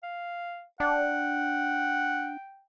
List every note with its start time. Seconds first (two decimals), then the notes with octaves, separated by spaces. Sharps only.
0.03 F5
0.80 D4 F#5 G5